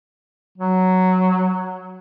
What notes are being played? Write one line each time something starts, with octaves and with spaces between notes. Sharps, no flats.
F#3